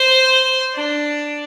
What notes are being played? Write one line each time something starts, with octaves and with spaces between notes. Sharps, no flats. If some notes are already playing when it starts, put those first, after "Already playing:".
Already playing: C5
D4